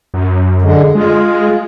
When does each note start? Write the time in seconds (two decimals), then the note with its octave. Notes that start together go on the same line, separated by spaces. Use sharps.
0.14 F#2
0.62 D3 G#3
0.95 G#3 F4